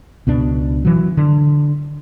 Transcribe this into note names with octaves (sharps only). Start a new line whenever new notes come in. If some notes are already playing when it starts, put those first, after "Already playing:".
C#2 B2 D4
E3 F#3
D3